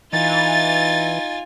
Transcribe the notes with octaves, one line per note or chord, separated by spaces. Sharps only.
E3 D#4 F4 G#5 A6